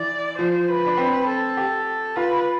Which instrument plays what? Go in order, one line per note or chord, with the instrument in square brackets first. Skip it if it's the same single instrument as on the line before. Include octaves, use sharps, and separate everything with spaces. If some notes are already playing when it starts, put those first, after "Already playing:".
Already playing: [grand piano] E3 [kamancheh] D5
[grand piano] F3 [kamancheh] C5
[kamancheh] B4
[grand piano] D4
C4
[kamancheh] A4
[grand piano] G4
[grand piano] F4 [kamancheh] B4